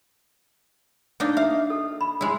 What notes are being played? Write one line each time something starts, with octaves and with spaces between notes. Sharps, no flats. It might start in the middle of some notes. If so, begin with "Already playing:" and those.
A#3 D4 D#4
E5 F5
A4
B5
G#3 E4